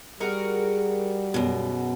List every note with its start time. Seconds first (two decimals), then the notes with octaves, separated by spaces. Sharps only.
0.20 G3 F#4 G#4 A#4
1.34 F#2 B2